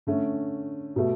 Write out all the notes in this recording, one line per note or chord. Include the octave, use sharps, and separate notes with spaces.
D3 A3 C#4
B2 A3